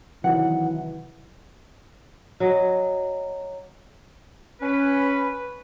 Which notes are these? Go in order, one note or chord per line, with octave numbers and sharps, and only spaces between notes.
C3 D#3 E3 F#3 F#5
F#3 D#5
C#4 B4